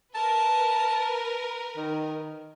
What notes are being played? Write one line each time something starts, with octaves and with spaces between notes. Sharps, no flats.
A#4 B4 A5
D#3